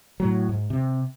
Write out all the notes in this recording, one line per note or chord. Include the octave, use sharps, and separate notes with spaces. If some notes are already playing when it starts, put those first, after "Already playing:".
A2 F#3
G#2
C3